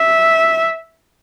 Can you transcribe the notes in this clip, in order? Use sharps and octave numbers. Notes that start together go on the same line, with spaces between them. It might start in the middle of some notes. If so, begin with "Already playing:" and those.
Already playing: E5